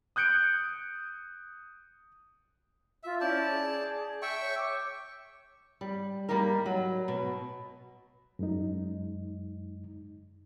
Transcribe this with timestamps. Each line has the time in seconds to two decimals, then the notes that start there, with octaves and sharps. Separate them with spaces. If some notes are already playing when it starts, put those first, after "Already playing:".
0.16 D#6 F#6 G6 C#7 D7
3.03 F4 E5
3.21 C#4 E4 D5 A5 G6
3.51 G#4
4.22 E5 G5 C#6
4.39 C#5
4.57 D6
5.81 G3
6.29 G3 A#3 D#4 G4 A#4
6.66 F#3
7.08 B2
8.39 F#2 G#3 D#4